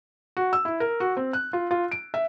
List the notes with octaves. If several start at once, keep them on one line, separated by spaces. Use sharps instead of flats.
F#4
E6
E4
A#4
F#4
C4
F#6
F4
F4
D7
E5